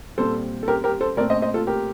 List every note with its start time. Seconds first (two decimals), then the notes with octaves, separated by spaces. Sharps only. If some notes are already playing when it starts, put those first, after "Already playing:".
0.18 A#2 G3 C4 A4 C5
0.63 A4
0.68 G4 A#4
0.84 G4 A#4
1.01 A4 C5
1.17 A#2 A3 C4 A#4 D5
1.30 C5 D#5
1.42 C5 D#5
1.54 F4 A4
1.67 G4 A#4